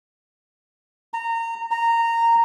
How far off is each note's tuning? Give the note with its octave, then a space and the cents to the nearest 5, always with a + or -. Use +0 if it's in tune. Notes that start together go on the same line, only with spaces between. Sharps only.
A#5 -25
A#5 -15